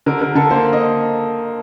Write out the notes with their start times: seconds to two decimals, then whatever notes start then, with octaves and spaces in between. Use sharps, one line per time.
0.06 D3 A#4
0.21 D3 A#4
0.35 D3 A4
0.50 A#3 C5
0.73 D#5